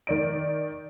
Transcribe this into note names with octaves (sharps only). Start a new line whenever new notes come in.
D#3 D5 D7